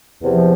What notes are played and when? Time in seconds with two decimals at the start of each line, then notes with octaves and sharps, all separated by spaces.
0.22 E2 C3 F3